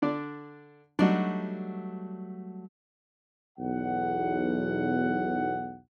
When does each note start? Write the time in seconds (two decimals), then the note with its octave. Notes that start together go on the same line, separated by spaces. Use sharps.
0.02 D3 D4 D5
0.99 F#3 G3 A3 D4 D#4 F#4
3.59 B1 E2 F#5